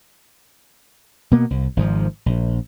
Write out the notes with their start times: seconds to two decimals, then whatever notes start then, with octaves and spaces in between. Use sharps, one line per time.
1.31 B2 A#3 B3
1.50 C2
1.77 G#1 G#2 F3
2.26 A#1